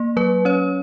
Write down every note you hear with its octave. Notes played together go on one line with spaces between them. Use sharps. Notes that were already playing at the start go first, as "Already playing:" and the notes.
Already playing: A#3
F#3 B4
C#4 C#5